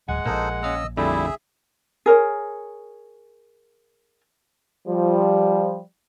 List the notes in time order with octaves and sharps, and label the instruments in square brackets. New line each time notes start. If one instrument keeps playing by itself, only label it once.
[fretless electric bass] D1 [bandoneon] G#3 F#5 [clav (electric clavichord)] G#5
[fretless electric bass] A#1 A#2 [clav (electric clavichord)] A#3 [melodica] D#4 A4 C5
[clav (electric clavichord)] C#4 F5 A#5 [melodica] D#5 E6
[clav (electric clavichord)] F2 D3 A3 [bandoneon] G3 E4 [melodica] G#4 E5
[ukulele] G#4 A#4 C#5
[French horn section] F3 G3